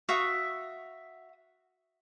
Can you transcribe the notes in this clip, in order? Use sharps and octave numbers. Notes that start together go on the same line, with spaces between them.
F#4 E5 F5 C#6 D#6 E6